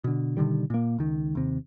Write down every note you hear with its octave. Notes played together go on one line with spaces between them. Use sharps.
B2 D3
B2 D3 D#3 G3
A#2 A#3
C#2 D#3
D#2 C3